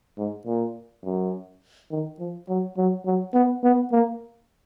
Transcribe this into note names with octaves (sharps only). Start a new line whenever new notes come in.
G#2
A#2
F#2
D#3
F3
F#3
F#3
F#3
B3
B3
A#3